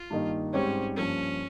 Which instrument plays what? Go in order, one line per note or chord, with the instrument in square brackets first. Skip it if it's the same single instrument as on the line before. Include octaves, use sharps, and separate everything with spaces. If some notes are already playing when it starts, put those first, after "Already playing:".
Already playing: [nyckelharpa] F4
[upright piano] G2 D#3 A#3 D#4
[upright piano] G#2 G3 C4 G4 C#5 [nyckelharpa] C#4
[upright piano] G2 F3 A#3 [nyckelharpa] C#4